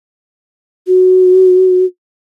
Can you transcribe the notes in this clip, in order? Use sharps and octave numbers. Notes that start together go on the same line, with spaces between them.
F#4